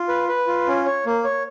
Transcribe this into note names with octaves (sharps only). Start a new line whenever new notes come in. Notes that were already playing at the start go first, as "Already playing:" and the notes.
Already playing: F4
B4
B4
F4
C#4
C#5
A#3
C#5